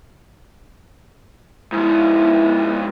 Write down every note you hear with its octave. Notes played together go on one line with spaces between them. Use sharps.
G#2 F3 E4